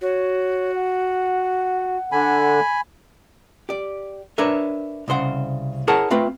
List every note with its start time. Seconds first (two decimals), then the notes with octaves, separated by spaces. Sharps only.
0.01 F#4 C#5
0.74 F#5
2.12 D3 G#5 B5
3.69 G4 D5
4.38 D4 A#4 B4 C#5 E5
5.08 C2 C#3 C5 F#5
5.88 E4 G#4 A#4 C#5 F#5 A5
6.11 A3 C4 F4 B4